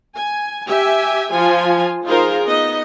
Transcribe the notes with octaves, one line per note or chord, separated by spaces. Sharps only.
G#5
G4 E5 G#5
F3 F4 G#5
D#4 F4 G#4 A#4 C5
B3 D#4 D#5